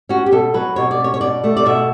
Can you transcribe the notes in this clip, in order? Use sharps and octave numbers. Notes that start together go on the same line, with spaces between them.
C#4 F#4
G4
B2 A4
F#3 B4
B2 C#5
D5
C#4 C#5
C#5
B2 D5
A3
D5
B2 E5